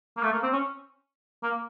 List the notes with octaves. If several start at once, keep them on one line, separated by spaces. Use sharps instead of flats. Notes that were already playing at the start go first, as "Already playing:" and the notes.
A#3
A3
A#3
C4
C#4
A#3